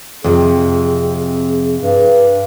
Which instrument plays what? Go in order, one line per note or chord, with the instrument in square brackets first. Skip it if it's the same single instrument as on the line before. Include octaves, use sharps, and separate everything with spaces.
[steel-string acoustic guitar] F2 C3 [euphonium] G#4
[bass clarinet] G2